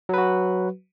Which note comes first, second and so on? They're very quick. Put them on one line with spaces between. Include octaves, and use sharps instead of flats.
F#3 B4 F#4